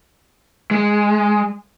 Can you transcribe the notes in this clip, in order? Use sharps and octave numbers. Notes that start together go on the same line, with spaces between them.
G#3